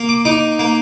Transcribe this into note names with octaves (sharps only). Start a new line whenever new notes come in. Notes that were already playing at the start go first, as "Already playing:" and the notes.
Already playing: A#3
D6
D#4 D6
A#3